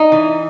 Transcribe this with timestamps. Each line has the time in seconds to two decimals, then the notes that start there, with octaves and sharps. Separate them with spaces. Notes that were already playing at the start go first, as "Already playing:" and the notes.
Already playing: D#4
0.12 E3